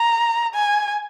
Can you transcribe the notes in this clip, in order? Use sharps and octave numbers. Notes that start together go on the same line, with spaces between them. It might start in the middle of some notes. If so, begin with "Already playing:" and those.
Already playing: A#5
G#5